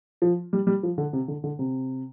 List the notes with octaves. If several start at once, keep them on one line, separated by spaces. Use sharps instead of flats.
F3
G3
G3
F3
D3
C3
D3
D3
C3